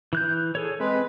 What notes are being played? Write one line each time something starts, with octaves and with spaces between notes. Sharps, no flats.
E3 F#6 G6
G#4 A4 C#5
G#3 C4 B4